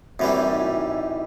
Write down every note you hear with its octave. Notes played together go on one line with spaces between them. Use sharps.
F#2 E3 G3 C4
D#4
E4
D#4